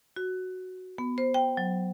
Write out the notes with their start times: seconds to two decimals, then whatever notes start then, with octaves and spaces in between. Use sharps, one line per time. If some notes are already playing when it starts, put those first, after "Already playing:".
0.16 F#4
0.98 B3
1.18 C5
1.34 G5
1.57 F#3